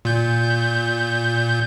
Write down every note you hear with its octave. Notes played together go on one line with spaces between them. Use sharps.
A#2 G6